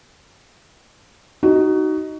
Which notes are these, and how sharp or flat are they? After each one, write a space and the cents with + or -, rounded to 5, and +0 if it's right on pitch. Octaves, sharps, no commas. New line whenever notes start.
D#4 +0 F#4 +25